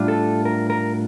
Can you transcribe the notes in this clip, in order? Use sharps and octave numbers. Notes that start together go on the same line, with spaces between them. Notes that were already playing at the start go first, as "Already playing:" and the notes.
Already playing: A2 G3 D4 F4
A4
A#4
A#4